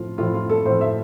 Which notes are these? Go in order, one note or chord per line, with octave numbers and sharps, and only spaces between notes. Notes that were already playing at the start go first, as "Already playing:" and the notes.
Already playing: A2 F3 F4
A2 F3 F4
F4
A4
A2 F3 C5
E5